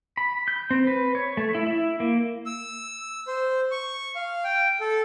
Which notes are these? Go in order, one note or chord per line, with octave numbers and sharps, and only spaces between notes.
B5
G6
C4
B4
C#5
A3
E4
E4
A#3
E6
C5
C#6
F5
G5
A4